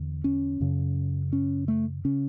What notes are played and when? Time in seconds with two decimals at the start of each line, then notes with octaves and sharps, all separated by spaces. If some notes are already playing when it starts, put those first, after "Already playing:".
Already playing: E2 D3
0.24 C#4
0.61 F#2 C#3
1.33 C#4
1.68 A3
2.05 C#3 C#4